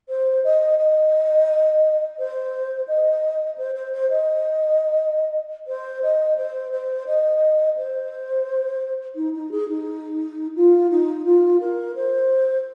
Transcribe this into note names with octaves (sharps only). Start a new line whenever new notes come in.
C5
D#5
D#5
C5
D#5
C5
C5
C5
D#5
C5
D#5
C5
C5
D#5
C5
D#4
D#4
G#4
D#4
F4
D#4
F4
A#4
C5